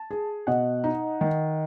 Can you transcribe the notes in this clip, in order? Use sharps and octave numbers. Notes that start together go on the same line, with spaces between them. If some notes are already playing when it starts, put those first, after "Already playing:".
Already playing: A5
G#4
B2 D#5 F#5
D#4
D#3